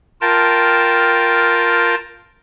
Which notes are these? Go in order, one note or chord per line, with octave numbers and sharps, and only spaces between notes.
F4 A#4 G5 A5